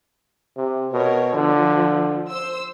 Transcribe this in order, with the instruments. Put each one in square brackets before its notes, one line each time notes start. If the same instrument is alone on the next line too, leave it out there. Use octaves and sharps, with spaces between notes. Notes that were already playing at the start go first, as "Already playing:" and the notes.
[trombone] C3
[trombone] B2 [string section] A#4 C#5
[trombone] D3 [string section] F3
[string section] C5 E6